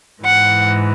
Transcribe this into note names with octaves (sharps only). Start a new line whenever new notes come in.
G#2 E3 F#5